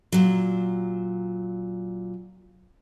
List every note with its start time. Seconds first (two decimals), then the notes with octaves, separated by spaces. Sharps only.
0.12 A#2 F#3